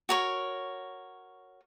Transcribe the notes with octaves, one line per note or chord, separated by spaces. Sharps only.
F#4 A#4 C#5